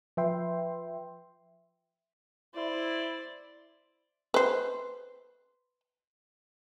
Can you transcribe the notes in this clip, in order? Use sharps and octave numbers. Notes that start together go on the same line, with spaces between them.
F3 B4 E5 G5 C6
E4 C5 D5
B4 C5